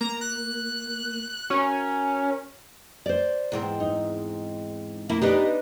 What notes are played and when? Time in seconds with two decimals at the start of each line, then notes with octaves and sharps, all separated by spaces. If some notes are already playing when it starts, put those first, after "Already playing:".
0.01 A#3 A#5
0.21 F#6
1.50 C#4 F#4 A#4
3.06 C5 D5
3.52 E2 G#2 C4
3.80 D#4
5.10 A#3 E4
5.22 B3 D4 D#4 G4 B4